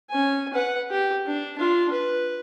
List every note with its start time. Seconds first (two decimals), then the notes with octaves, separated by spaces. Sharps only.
0.10 C#4 G#5
0.54 B4 F#5
0.91 G4
1.27 D4
1.58 D4 F4
1.92 B4